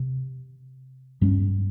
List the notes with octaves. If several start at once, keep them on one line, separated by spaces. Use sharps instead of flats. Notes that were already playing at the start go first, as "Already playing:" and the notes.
Already playing: C3
G2 G3 C#4